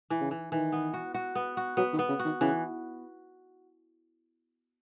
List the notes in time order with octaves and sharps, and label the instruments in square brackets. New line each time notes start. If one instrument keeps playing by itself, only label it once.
[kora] E3
[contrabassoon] C#3
[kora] E3
[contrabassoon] D#3 [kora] E3
[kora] B3
F#4
F#4
B3
F#4
[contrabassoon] F#3 [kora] B3
[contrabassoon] D#3
[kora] B3
[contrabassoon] C#3
[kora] F#4
[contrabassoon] D#3
[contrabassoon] C#3 [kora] E3